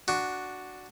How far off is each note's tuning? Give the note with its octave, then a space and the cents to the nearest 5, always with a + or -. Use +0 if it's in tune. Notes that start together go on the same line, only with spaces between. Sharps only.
D4 +0 F#4 +0